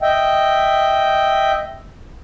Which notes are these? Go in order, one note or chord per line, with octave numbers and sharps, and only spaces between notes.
D#5 E5 G5